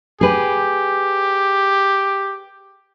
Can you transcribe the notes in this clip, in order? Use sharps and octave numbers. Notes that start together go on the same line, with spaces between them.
G4 G#4 B4